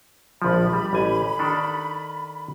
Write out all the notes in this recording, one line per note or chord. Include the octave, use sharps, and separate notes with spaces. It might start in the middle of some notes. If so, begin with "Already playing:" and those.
A#1 F3 B5
G3
A1 G#5 A#5
D#3 D4 A4